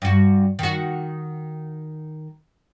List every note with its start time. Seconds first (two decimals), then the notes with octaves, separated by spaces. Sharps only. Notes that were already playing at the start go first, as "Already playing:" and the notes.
0.02 G2 F#4
0.59 D#3 F#4